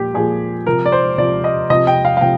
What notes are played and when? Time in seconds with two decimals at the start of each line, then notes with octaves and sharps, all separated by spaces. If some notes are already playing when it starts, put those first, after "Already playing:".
Already playing: A#2 F3 G4
0.14 A#2 F3 G#4
0.66 C3 F3 A#4
0.86 D5
0.92 C5
1.18 C3 F3 D5
1.44 D#5
1.70 C3 F3 D#5
1.87 G5
2.05 F5
2.17 F5
2.21 C3 F3 G5